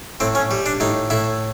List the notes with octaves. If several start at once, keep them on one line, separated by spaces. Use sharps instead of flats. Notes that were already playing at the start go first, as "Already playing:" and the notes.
A2 C4
C#4
G3
D4
A2 D#4
A2 E4